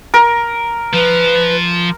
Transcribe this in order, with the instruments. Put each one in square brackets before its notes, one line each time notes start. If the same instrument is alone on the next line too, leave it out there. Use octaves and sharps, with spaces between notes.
[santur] A#4
[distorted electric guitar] F3 [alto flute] B4